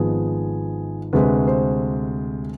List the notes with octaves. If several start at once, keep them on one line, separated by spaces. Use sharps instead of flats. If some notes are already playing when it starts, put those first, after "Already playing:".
Already playing: G#1 G#2 F3 B3 G#4
D2 C3 G#3 C4 B4
C5